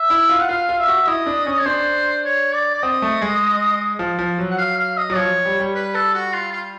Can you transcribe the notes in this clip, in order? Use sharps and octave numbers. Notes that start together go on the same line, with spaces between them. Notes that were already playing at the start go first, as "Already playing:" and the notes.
Already playing: E5
E4
F4
F#5
F4 F5
F4
E5
F#4
E4 D#5
D4
C#4
C#5
D4 C5
C#5
D5
D5
C4 D#5
A3
G#3
F3
F3
F#3
F#5
F5
F5
D#5
F#3
F3 C#5
G3
G3
B4
A4
F#4
F4
F4